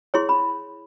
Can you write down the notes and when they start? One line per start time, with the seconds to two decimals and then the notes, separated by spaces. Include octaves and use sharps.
0.14 E4 G#4 C#5 C6
0.29 B5